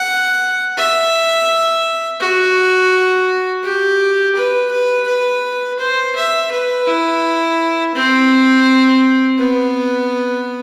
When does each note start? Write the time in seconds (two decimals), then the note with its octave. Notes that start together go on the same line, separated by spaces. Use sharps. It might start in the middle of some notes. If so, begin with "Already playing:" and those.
Already playing: F#5
0.77 E5
2.20 F#4
3.64 G4
4.36 B4
4.71 B4
5.08 B4
5.79 C5
6.16 E5
6.51 B4
6.87 E4
7.95 C4
9.38 B3